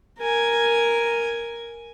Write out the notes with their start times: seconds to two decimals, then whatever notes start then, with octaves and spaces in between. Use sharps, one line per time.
0.19 A#4 G#5